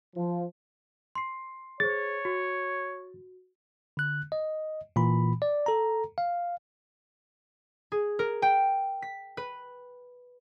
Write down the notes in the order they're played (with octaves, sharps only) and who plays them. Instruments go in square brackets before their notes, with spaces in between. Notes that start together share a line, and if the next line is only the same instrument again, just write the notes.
[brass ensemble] F3
[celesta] C6 C7
[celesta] G#4 C5 [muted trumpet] C#5 [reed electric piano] A6
[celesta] F#4
[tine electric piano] D3 F#6
D#5
A#2 E3 B5
D5
A4 A#5
F5
[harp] G#4
A#4
G5
B6
B4